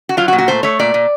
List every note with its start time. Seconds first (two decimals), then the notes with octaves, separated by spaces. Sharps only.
0.09 F#4
0.17 F#3 F4
0.28 F#4
0.33 A#2
0.38 F#4
0.48 A3 C5
0.63 A3 C#5
0.79 A#2 D5
0.94 A#2